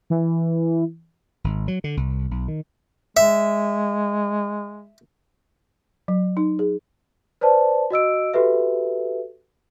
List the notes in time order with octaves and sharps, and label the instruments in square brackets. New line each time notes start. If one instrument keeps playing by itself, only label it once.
[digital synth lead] E3
[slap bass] G#1
F#3
D3
C2
B1
D#3
[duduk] G#3 [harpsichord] E5
[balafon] F#3
D#4
G#4
[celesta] B4 C5 D5 A5
F#4 D#5 E6 D7
F#4 G4 A4 B4 E5